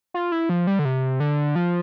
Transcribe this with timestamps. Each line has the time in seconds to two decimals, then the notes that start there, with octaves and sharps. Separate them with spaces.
0.14 F4
0.32 E4
0.49 F3
0.67 G3
0.79 D3
0.85 C3
1.20 D3
1.56 F3